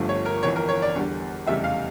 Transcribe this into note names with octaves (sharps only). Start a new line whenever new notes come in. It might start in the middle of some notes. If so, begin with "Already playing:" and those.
Already playing: G1 G2 F3 A3
C#5
A#4
G1 F2 E3 C#5
A#4
C#5
D5
E2 D3 G3
F1 E2 C#3 G3 E5
F5